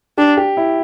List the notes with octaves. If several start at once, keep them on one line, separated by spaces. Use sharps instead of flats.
D4 G4
G4
E4